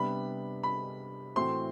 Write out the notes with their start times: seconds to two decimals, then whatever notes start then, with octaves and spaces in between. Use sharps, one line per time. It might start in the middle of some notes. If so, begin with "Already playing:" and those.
Already playing: C3 G3 B3 D4 B5
0.63 B5
1.36 A2 E3 A3 C4 F#4 C6